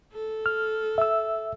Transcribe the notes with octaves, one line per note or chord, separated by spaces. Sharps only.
A4
F6
E5 E6